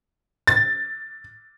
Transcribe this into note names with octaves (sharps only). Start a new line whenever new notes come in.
A6